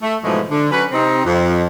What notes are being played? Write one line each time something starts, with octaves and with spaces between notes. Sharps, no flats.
A3
G#2 B2 E3 F3 G#3 A3
D3
F#3 C#4 F#4 B4
C3 C4 D#4
F2